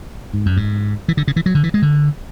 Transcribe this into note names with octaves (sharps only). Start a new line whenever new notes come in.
G#2
F#2
G#2
E3
D3
C#3
E3
F#3
D3
E3
G#3
D3